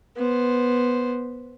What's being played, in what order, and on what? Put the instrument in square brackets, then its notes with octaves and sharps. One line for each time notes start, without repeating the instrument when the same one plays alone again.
[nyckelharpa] B3 C5